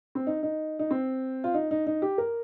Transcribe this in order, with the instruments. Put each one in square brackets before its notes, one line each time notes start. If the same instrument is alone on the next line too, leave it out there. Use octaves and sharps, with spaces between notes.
[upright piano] C4
D#4
D#4
D#4
C4
F4
D#4
D#4
D#4
G4
A#4